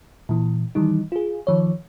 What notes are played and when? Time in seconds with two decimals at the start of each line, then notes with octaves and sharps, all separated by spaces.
0.29 A#2 E3
0.75 D#3 E3 G3 D#4
1.12 F4 G#4
1.47 D#3 F3 C#5